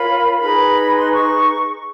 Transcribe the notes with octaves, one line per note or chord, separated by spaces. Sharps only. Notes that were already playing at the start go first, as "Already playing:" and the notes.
Already playing: F4 A#4 C#5 B5
D#4 G#4 B4 B5
C6
C#6